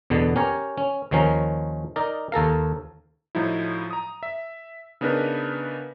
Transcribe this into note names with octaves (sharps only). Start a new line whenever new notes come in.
E2 B2 D3 B3
C#4 G4 A#4 C#5
C#4
D#2 D#3 F3 C#4 A#4
D#4 A#4 D5
D#2 A4 A#4 F5
A2 F3 F#3 D#4 E4
A#5 D#6
E5
C#3 B3 D4 D#4 A#4 B4